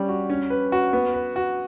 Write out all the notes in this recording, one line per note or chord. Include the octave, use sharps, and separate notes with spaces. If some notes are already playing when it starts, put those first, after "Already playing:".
Already playing: G3 C#4
F#4
C#4
B4
F#4
B3
B4
F#4